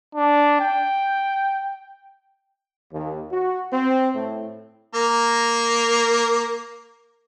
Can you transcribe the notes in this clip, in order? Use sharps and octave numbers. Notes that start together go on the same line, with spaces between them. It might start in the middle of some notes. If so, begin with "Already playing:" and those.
D4
G5
D#2
F#4
C4
A2
A#3 A#4